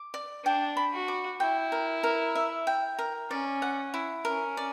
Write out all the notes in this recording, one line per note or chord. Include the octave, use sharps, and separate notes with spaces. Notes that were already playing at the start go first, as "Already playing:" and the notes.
Already playing: D6
D5
D4 G5
B5
F#4
D6
E4 G5
A#4
A#4
E5
G5
A#4
C#4 D5
F#5
E4
C#4 A#4
D5